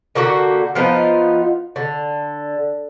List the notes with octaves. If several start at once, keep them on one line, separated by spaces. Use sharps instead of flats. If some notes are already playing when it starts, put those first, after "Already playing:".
D3 A#3 F#4 G4
F3 B3 D#4 F4
D3